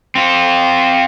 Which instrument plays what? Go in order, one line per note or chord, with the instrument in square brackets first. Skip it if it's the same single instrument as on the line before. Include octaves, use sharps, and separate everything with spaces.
[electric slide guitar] C4 F4